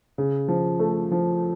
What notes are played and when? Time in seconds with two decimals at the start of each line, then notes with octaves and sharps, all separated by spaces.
0.18 C#3
0.48 F3
0.80 A3
1.11 F3